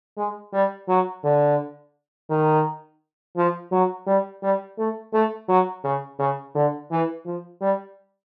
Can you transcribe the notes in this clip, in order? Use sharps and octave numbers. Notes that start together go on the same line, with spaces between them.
G#3
G3
F#3
D3
D#3
F3
F#3
G3
G3
A3
A3
F#3
C#3
C#3
D3
E3
F3
G3